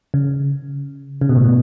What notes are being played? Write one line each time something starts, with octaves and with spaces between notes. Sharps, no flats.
C#3
C#3
B2
A2
B2